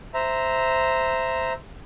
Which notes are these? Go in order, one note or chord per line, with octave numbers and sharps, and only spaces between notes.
C5 E5 A#5